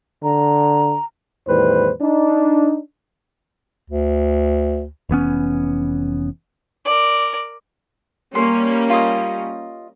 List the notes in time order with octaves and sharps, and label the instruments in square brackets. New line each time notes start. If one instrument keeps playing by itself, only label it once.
[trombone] D3 [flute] A#5
[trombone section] E2 A2 D#3 G3 B4 C5
D4 D#4
[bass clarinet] D2
[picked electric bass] F1 E3 B3 C#4
[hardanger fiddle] A#4 D5
[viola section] G3 A#3 C#4 [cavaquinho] C6
[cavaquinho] F4 D#5